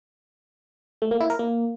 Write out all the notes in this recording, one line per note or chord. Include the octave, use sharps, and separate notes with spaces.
A3
A#3
E4
A#4
A#3